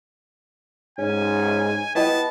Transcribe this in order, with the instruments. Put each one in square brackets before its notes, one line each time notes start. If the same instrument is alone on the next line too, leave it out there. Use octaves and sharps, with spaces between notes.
[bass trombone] G#2 [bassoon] C#4 [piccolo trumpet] G#5
[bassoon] B3 [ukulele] E4 G4 D#5 [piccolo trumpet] A5